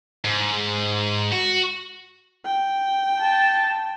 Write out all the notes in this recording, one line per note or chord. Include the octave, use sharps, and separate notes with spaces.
G#2
F#4
G5
A5